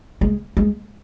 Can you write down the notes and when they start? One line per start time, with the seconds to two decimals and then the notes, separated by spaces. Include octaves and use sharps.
0.21 G#3
0.57 G#3